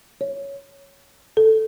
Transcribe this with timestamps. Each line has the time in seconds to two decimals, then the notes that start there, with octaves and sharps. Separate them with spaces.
0.21 C#5
1.37 A4